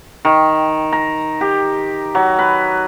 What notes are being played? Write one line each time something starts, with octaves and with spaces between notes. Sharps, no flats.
D#3
A#5
G4
F#3
B4